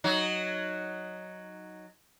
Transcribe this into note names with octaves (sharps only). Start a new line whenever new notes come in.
F#3 D#4